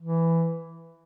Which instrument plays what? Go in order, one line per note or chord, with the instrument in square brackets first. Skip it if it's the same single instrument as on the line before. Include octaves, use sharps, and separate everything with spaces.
[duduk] E3